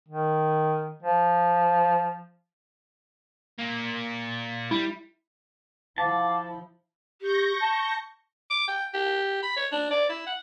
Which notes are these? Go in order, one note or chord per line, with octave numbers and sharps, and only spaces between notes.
D#3
F3
A#2 A#3
G3 E4
F3 E4 F5 F#5 A5 D6
G4 C#6 G6 A#6
A5
D6
G5
G4
B5
C#5
D4
D5
E4
F#5